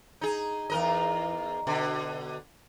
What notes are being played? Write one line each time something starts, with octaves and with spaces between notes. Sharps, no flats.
D#4 G#4
E2 A#4 D#5
B2 D3